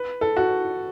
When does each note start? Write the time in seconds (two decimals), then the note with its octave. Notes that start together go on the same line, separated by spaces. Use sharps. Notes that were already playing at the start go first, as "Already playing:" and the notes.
Already playing: B4
0.21 A4
0.37 F#4